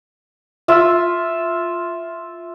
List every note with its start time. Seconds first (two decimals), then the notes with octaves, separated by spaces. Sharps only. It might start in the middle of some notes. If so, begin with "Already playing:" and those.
0.68 F4 E5